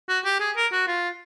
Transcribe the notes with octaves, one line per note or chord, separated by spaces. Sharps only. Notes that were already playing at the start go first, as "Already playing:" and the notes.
F#4
G4
G#4
A#4
F#4
F4